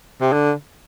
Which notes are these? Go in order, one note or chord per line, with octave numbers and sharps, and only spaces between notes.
C3
D3